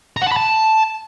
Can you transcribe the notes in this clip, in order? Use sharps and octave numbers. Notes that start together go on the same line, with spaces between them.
A#5
F#5
A5
B5
A5